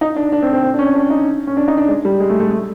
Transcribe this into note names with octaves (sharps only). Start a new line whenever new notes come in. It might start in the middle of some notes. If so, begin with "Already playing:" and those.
D#4
D4
D4
C4
C4
C4
D4
C#4
D4
D#4
C#4
D4
D#4
D4
G#3
G3
G#3
A3
A3
A3